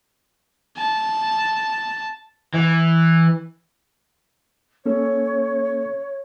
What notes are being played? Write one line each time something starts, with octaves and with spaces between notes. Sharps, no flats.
A5
E3
A#3 C#4 A4 C#5